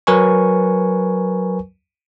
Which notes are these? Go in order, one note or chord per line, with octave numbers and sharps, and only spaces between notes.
F#3 A#4 B4 G#5 C#6